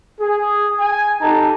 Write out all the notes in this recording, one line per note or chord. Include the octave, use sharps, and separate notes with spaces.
G#4
G#5
D#4 G4 A4 A5 A#5